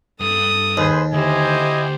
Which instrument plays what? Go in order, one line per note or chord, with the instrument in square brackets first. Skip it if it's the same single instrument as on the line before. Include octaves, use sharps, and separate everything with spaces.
[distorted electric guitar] G2 [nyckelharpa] A4 D#6
[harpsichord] D#2 [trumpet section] G#4 B4 C5
[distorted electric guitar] D2 [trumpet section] E4 D#5 G#5 [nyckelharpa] G4 C5